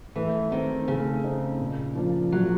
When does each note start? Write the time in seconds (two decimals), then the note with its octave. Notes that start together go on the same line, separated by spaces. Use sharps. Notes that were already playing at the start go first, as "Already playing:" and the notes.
0.15 E3 A3
0.51 D#3 C4 D#4
0.88 C#3 A3
1.24 C4 D#4
1.60 A#2
1.95 F3 A#3 D4 F4
2.32 A#2 F#3